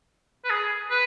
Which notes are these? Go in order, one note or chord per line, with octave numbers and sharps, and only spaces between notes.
B4
G#4
B4